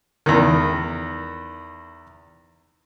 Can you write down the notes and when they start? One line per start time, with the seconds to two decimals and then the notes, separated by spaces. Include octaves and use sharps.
0.26 E2 D#3